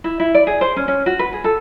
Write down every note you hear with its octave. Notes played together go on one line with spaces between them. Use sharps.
E4
E4
D5
G#4
C5
C#4
C#4
F#4
B4
G#4
A4